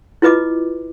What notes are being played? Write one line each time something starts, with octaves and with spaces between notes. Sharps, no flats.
E4 F4 B4 D#5 D6